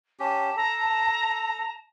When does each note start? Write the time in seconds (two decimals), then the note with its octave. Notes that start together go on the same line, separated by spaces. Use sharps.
0.19 C#4 G4 A5
0.57 A4 A#5